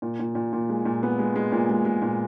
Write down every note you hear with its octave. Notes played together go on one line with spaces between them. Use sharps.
A#2
A#2
A#2
A#2
G#3
A#2
B3
G#3
G#3
A#2
G#3
G#3
A#2